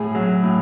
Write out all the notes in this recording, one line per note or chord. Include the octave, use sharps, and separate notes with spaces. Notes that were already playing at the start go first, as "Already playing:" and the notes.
Already playing: A2 G#4
F#3
A2